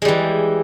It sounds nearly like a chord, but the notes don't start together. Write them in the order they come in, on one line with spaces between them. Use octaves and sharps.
G#3 G3 E3